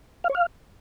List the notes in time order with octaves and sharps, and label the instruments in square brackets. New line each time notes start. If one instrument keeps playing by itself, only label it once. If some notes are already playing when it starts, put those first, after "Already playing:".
[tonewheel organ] F5
C#5
F5